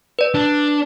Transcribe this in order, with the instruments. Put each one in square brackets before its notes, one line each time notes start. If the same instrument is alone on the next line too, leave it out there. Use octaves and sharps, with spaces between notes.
[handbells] B4 D5
[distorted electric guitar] D4